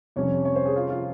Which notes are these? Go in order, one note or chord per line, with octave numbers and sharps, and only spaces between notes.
F2 C3 G3 C#4 C#5
C#5
C5
G#4
F4
F4